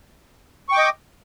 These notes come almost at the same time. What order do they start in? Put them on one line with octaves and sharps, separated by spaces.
C#6 G5 D6 D#5